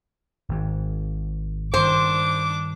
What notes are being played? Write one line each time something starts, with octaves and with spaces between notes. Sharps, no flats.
G#1 G#2
G2 D#3 D4 C5 D6